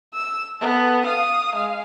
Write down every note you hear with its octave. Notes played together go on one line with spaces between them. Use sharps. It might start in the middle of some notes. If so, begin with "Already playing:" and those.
E6
B3 A4
F5 D#6
G#3 F5